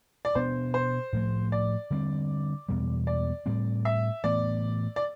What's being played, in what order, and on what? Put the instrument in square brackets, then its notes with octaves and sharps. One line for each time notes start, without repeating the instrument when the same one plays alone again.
[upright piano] D5
[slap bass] B2 B3 D4 [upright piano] C5
[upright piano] C5
[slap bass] A2 F3 A3
[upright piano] D5
[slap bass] D3 G3 C4
E2 B2 G3
[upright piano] D5
[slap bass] A2 G3 C4
[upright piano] E5
[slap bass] A2 E3 B3 [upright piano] D5
[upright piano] D5